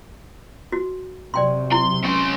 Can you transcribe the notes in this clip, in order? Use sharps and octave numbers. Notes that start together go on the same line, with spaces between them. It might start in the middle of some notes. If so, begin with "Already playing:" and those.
F#4
C3 F#3 D5 G5 C6
E4 C6
C#4 C6